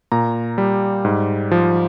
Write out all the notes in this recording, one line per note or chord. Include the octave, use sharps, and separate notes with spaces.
A#2 A#5
G3
G#2
F3